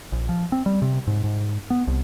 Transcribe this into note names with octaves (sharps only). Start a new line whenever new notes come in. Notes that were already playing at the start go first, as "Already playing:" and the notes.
A#1
F3
C4
G3
C3
G#2
G#2
B3
C2